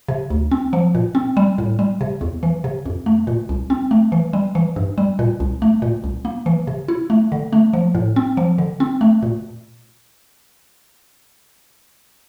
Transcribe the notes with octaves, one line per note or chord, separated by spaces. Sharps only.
C3
D2
C4
F3
A#2
C4
G3
A2
G3
C3
E2
E3
C3
F2
A3
A#2
C2
C4
A3
E3
G3
E3
G2
G3
A#2
C2
A3
A#2
C2
A#3
E3
C3
E4
A3
D3
A3
F3
A2
C4
F3
D3
C4
A3
A#2